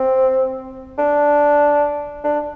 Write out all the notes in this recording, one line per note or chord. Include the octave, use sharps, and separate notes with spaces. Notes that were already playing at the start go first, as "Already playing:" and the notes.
Already playing: C4
D4
D4